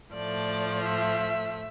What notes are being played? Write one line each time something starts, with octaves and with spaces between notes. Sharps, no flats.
A2 F3 A3 D5
E5